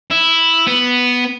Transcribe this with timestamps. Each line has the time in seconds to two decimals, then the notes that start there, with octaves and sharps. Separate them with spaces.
0.11 E4
0.67 B3